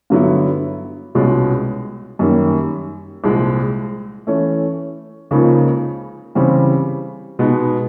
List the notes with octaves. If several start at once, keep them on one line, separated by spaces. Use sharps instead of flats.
G2 D3 F#3 B3 E4
C2 B2 G#3 C#4 F4
F#2 D#3 G3 A#3
C2 A#2 F3 G#3
E3 A3 C#4
C#2 C#3 F3 A#3 D#4
C#3 E3 G3 C4
B2 G#3 B3 D#4